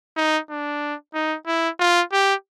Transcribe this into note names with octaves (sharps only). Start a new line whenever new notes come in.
D#4
D4
D#4
E4
F4
G4